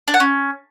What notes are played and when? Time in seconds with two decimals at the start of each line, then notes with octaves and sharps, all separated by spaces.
0.08 D4
0.14 F#5
0.20 C#4